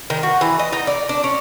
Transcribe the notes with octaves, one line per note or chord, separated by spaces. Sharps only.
D#3
F#4
E3
D#5
D#4
D5
D4
C#4